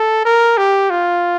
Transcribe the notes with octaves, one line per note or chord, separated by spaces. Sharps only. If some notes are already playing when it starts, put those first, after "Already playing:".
Already playing: A4
A#4
G4
F4